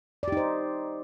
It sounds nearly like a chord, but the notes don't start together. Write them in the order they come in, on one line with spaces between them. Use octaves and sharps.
D5 G4 D#4 C5